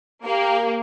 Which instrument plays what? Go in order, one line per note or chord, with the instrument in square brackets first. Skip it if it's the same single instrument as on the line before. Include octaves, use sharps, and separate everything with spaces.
[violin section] A#3 [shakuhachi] G4